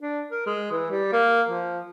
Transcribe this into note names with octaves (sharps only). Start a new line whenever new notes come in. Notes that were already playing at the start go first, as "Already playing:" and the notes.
D4
A#4
G#3
E3
G3
A#3
F3